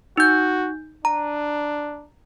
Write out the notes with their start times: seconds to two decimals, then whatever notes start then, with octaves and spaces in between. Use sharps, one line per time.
0.17 D#4 F#4 G6
1.05 D4 A#5